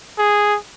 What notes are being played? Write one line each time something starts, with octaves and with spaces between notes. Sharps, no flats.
G#4